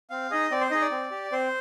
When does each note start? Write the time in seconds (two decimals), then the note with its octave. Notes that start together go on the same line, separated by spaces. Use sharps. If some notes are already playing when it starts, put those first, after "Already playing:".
0.10 C4 F5
0.31 D#4 G#4 D#5
0.51 C4 D5
0.61 C5
0.71 D#4 G#4 D#5
0.81 D5
0.91 C4
1.11 G4
1.32 C4 C5